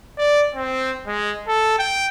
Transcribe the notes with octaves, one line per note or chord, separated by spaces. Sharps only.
D5
C4
G#3
A4
G5